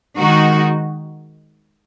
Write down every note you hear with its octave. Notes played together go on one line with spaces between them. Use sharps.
D#3 G#3 D#4 F#4